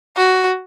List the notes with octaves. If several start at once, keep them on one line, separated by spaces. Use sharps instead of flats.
F#4